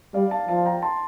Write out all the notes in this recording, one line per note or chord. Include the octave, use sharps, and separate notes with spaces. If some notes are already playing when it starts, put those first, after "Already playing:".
G3 D5 F5
F5 A5
F3 F5 A5
G5 A#5
A5 C6